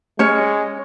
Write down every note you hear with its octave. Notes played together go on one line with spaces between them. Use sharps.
G#3 C#4 C#5